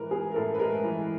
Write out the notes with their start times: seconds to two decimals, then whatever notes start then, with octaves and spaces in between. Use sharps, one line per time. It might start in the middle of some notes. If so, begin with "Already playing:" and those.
Already playing: A2 E3 G#3 A#4 B4
0.11 B3 G#4
0.32 A#4
0.36 A2 A4
0.54 B4
0.59 G#3 A#4
0.84 E3